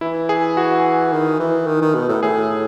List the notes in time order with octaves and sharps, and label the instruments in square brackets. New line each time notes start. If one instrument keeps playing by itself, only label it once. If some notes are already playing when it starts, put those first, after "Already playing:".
[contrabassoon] E3 [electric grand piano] E4
[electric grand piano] G#4
F#4
[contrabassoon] D#3
E3
D#3
D#3
B2
A2
[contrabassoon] A2 [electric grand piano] G#4